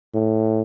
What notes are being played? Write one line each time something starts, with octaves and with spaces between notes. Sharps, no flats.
A2